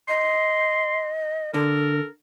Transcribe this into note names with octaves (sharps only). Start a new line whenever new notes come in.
D#5 C6
D3 A4 A#4